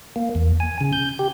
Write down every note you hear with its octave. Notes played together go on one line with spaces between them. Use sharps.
A#3
E2
G#5
C#3
G6
G4